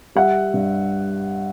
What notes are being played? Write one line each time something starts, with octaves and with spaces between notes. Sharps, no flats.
G3 E5 F#5
G2